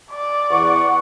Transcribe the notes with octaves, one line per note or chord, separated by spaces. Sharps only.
D5
E2 F#5 C#6